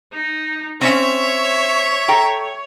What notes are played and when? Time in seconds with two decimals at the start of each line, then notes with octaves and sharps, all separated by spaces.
0.13 D#4
0.81 C4 C#4 C#5 E5
2.08 A4 G5 A#5